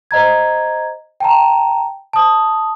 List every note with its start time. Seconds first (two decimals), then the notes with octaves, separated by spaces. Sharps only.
0.11 C5 D#5 A#5 G#6
1.20 G5 A5 A#5
2.13 A5 D#6